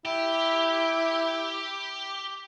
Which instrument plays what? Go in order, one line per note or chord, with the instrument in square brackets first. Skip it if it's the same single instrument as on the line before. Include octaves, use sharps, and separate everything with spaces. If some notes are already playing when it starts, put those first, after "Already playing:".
[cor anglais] E4 [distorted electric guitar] G4